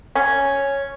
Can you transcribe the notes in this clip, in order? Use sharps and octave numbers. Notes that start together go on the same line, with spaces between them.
C#4